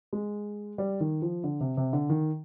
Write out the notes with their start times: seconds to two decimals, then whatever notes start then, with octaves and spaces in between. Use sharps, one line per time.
0.13 G#3
0.78 G3
1.00 D#3
1.22 F3
1.44 D3
1.61 C3
1.77 C3
1.93 D3
2.10 D#3